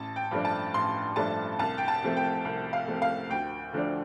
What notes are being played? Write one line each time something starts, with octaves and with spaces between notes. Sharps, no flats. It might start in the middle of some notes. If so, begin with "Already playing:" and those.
Already playing: A1 A5
G5
G2 F3 A3 D4
A5
A1 C6
G2 F3 A3 D4 A5
C2 A5
G5
A5
C3 F3 A3
G5
C2
F5
C3 F3 A3
F5
D2 G5
D3 F3 A3 D4